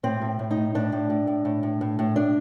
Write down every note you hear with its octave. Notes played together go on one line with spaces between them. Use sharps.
A2 C4
A2
A2
D#4
A2
A2 D4
A2
A2
A2
A2
A2
A2
A2
A2 D4